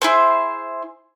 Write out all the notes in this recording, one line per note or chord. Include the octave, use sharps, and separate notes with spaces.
E4 G#4 C5